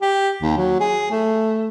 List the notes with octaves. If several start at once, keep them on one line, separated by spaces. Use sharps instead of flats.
G4
D#2
F#3
G#4
A3